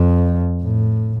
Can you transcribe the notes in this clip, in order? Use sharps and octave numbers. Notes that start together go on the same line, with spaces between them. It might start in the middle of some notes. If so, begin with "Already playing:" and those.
Already playing: F2
A2